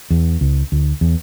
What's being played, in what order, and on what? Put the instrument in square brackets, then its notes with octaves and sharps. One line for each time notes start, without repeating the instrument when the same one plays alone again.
[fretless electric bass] E2
C#2
D2
E2